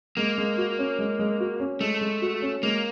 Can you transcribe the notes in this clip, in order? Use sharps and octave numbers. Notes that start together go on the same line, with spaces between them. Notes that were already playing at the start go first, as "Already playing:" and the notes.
G#3 A#3
G#3
F#4
C#4
G#3
G#3
F#4
C#4
G#3 A3
G#3
F#4
C#4
G#3 A#3